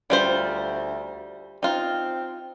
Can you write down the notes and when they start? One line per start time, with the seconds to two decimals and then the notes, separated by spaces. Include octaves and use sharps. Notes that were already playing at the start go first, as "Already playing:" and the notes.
0.10 D2 G3 F4 C5
1.63 C4 D#4 F4